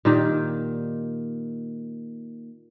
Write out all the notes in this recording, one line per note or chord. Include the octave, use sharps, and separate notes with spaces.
A#2 D#3 G4